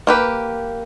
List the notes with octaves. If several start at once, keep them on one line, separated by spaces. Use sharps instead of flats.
A#3 G4 B4